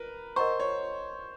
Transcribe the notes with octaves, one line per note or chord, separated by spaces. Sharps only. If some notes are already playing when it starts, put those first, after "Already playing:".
Already playing: A#4 B4
A#4 C5 D#5 F#5 A#5 C#6
C#5